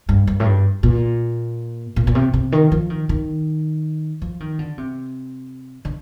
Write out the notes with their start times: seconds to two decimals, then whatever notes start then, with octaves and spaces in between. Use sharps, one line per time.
0.09 G2
0.27 G2
0.40 A2
0.46 G2
0.83 A#2
1.96 A#2
2.07 A#2
2.15 C3
2.34 C3
2.52 D#3
2.72 F3
2.90 D#3
3.09 D#3
4.22 F3
4.40 D#3
4.59 D3
4.78 C3
5.85 D3